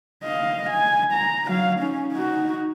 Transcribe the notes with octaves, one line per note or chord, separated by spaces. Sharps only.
D#5 F5
G#5
A#5
F#3 F5
C#4 D#4
D#4 F#4